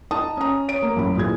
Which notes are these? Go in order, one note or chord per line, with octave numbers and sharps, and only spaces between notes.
D#4 A5 D#6
C#4 A#5
C#5 D7
A#3
A1 F#2 B5
A#2 E3 G#4 G#6